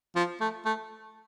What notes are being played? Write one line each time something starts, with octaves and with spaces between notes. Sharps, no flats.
F3
A3
A3